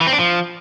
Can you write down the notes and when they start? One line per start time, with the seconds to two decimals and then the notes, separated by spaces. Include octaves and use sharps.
0.01 E3
0.07 C4
0.13 D4
0.19 F3